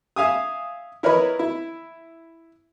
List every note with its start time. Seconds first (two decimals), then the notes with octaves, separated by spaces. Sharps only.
0.16 E5 F5 G#5 D#6
1.03 E4 A#4 B4 C#5 D#5 B5
1.39 E4